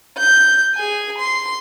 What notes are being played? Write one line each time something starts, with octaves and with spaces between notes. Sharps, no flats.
G6
G#4 G#5
C6